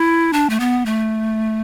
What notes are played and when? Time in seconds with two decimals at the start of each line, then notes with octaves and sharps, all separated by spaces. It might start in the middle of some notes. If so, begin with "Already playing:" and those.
Already playing: E4
0.33 D4
0.50 A3
0.60 B3
0.86 A3